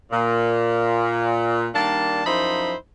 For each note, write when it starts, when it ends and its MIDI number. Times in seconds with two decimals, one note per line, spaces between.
0.11 1.68 46
1.75 2.25 51
1.75 2.25 55
1.75 2.25 58
1.75 2.25 62
1.75 2.25 81
2.26 2.75 42
2.26 2.75 53
2.26 2.75 63
2.26 2.75 64
2.26 2.75 72
2.26 2.75 83